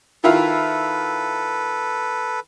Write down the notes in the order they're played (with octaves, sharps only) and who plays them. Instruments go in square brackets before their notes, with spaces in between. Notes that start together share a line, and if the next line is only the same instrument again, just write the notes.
[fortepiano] D#3 E4 F4 [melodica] A4 B4